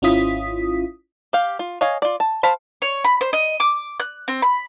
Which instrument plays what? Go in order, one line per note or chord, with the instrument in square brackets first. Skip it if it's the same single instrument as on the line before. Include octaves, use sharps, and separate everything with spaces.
[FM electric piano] G#1 C#4 E4 F4 D#6 B6
[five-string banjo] G4 F5
F4
C#5 D#5 F5 G#5
F4 D5
A5
C5 F5 A5 B5
[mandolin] C#5
B5
C5
D#5
D6
F#6
C4
B5